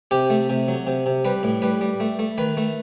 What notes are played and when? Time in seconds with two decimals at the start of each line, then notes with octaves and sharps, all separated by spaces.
0.11 C3 G4
0.30 A3
0.49 C3
0.68 F#3
0.87 C3
1.06 C3
1.25 G3 B4
1.43 A2
1.62 G3 B4
1.81 G3
2.00 A3
2.19 A3
2.38 D#3 B4
2.57 A3